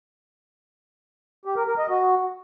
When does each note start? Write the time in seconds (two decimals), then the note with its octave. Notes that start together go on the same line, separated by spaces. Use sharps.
1.45 G4
1.56 A#4
1.67 A#4
1.78 D#5
1.89 F#4